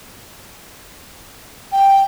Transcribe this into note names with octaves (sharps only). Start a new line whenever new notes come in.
G5